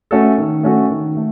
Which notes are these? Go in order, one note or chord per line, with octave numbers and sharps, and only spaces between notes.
A3 C#4 F#4 A4
D#3
A3 C#4 F#4 A4
D#3
A3